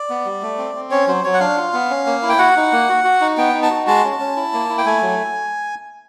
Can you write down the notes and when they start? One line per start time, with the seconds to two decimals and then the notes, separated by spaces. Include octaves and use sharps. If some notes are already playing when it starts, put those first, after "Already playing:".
Already playing: D5
0.10 B3
0.25 G3
0.42 A3
0.58 C4
0.75 C4
0.91 C#4 C#5
1.07 F#3 C5
1.24 F#3 C#5
1.34 F#5
1.40 D4 F5
1.57 F4
1.73 B3
1.89 C#4
2.06 A#3
2.22 E4
2.29 G5
2.39 F#4 F#5
2.56 D#4
2.72 A#3
2.89 F#4
3.04 F#4
3.21 D#4
3.37 B3 G5
3.54 D#4
3.63 A5
3.70 F#4
3.87 G#3 A5
4.04 C#4
4.19 C#4
4.36 E4
4.53 A#3
4.69 E4
4.78 G5
4.86 A3 G#5
5.02 F#3